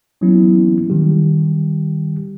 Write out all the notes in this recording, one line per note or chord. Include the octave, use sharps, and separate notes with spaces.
E3 F#3 A#3 B3 C#4 E4
D#3 G3 G4